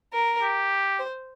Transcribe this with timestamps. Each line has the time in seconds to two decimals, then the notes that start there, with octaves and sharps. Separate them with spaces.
0.13 A#4
0.42 G4
0.99 C5